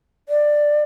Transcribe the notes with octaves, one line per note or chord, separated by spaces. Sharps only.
D5